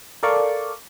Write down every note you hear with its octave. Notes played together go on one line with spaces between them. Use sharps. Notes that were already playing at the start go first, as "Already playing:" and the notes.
A4 A#4 D5 F5 C#6